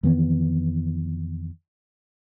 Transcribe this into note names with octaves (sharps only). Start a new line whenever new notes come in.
F2 D#3 E3 B3